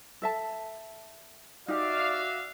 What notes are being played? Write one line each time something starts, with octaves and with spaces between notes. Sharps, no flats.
A4 E5 A5
D#4 F#4 G4 D5 E5 F5